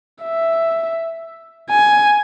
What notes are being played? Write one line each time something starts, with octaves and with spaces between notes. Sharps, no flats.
E5
G#5